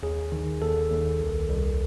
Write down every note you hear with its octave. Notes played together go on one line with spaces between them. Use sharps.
D#2 G#4
D#3
D#2 A4
D#2
C2
C2